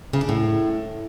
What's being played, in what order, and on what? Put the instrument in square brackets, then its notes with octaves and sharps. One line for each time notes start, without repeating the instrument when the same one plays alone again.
[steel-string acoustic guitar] C#3
D4
A2